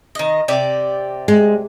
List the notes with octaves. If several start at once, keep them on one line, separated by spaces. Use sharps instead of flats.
D#3 D#5
C3 G4 D5
G#3